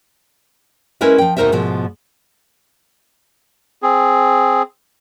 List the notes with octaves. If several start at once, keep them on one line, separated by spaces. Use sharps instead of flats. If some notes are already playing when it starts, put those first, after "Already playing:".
G#3 C#4 E4 A#4 B4 E5
F3 G5
D#2 B2 D#4 A#4 C5 E5
G#2 B2 F3 A3
C4 G#4